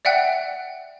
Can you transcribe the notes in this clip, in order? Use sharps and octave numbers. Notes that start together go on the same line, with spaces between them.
D5 E5 F#5 G5 F#6